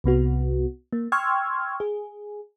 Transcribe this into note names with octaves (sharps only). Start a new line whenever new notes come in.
C2 C3 B3 F#4
A#3
G5 C6 C#6 E6 F6 G#6
G#4